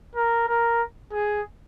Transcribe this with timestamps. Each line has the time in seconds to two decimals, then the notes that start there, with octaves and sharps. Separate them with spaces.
0.15 A#4
0.48 A#4
1.12 G#4